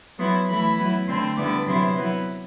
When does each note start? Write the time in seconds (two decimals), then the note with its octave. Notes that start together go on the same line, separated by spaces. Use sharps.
0.18 F#3 B3 E4 C6
0.48 E3 A3 E4 B5
0.78 F#3 B3 E4
1.08 D3 A3 C4 E4 C6
1.37 D3 G3 B3 E4 D6
1.67 C3 F#3 B3 E4 C6
1.97 F#3 B3 E4